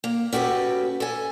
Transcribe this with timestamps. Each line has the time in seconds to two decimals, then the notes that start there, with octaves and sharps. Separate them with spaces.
0.04 A#3
0.32 C#4 F#4 G4 A4 B4
1.00 A4 G#5